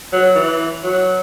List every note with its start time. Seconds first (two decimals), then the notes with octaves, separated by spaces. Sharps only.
0.13 F#3
0.35 E3
0.84 F#3